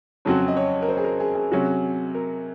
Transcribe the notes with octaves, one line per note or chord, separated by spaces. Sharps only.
F2 C#3 F#3 C4 F#4 C#5
D#5
C#5
A#4
C5
G#4
A#4
G#4
G#4
C3 F#3 C#4 F#4
A#4